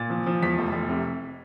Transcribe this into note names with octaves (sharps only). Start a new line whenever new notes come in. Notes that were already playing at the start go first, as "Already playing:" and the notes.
Already playing: A#2 A6
F3
F3
E2 B6
F1
F1
C3